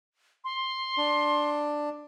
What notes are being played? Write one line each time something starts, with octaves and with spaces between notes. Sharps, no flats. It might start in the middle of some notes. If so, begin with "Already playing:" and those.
C6
D4